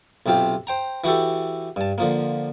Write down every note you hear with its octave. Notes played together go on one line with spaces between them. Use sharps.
B1 C3 C4 F4 G4
C5 G5 A#5
E3 F#4 G4 A4
G2 A5
D3 F3 A#3